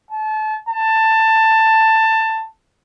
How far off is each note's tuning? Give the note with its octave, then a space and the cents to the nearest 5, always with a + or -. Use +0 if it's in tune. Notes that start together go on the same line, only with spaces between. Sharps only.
A5 -30
A5 +15